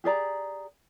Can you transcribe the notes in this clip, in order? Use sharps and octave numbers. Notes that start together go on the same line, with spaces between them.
G4 G#4 D5 A#5